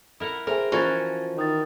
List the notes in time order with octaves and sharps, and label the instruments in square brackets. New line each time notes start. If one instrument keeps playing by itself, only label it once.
[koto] E4 A#4 F#5
[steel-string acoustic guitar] C4 [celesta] G#4 E5 G#5 [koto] A#4
[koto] E3 F#4 A#4 [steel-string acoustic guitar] F3 C#4 [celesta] G#5 G#6 A6
[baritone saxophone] D#3 [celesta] D#5 D#6 A6